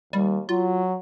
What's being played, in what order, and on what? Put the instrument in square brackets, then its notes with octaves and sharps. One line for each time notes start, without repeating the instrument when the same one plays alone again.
[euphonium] D#2 [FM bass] G3
[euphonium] F#3 [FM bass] F4